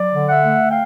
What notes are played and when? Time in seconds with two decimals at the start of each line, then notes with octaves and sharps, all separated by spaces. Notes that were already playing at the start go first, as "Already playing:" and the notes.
Already playing: F#3 D5
0.13 D3
0.27 E5 F#5
0.42 A3
0.70 F5 G5